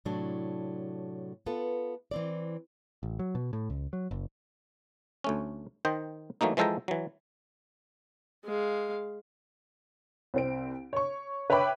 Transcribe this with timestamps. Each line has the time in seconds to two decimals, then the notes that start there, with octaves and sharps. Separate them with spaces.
0.05 A2 C3 F#3 D4
1.46 B3 F4 A4 B4
2.11 E3 C4 D5
3.03 A1
3.19 F#3
3.35 B2
3.53 A2
3.70 C#2
3.93 F#3
4.11 F#1
5.24 D2 A3 C#4
5.85 D#3 C5 D#5 G5
6.41 E3 F#3 A3 A#3 D#4
6.57 E3 F3 G#3 A4 G5 A#5
6.88 E3 F#3
8.45 G#3 F5
10.34 C2 C4 D7
10.93 C#5 C#6
11.50 B4 C#5 E5 G5 B5 D6